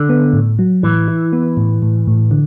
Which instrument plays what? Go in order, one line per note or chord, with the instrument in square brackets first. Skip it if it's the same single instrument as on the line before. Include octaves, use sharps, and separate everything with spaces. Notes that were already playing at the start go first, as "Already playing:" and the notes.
Already playing: [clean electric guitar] D3
[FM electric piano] B3
A2
F#3
[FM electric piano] A2 [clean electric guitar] E3
[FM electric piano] E4
B3
A2
A2
A2
D3